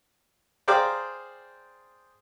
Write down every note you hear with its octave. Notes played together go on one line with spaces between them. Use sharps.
G#4 C5 D5 F5 G5 A#5